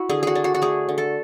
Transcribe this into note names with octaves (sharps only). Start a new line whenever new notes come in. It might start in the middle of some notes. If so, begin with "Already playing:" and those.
Already playing: E4 F#4
D3 G#4
F#4 G#4
D4
F#4
F#4
A3 G#4
D3
A4